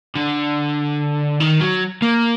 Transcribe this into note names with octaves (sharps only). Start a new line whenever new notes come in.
D3
D#3
F#3
A#3